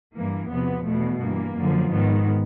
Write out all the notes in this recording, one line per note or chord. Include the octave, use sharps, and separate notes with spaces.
G2 E3 A#3
E2 C3 F3 B3
E2 B2 A3
G2 E3 A#3
F#2 D3 F3
G#2 D#3 B3